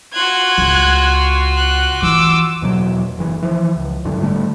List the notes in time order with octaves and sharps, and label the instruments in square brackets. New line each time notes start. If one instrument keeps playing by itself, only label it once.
[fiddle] F4 F#4 [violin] F#6 G#6
[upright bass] C#2
[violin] F#6
[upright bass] E3 [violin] D6 E6
[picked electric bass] E2 B2 F#3
F#1 E3
E3 F3
C#2
G#1 F#2 A2 D3
D3 G3 A3